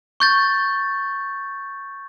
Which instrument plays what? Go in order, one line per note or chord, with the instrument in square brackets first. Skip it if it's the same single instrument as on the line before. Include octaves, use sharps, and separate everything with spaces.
[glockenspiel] C#6 G6 A6